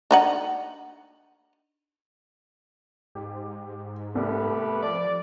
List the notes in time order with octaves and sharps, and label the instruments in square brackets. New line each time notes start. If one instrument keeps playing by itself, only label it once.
[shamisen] D4 D#4 F#5
[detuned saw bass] G#2 [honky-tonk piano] G4
[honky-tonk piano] C2 [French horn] A3 [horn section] B3 G4 B4
[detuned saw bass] F3 [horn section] D5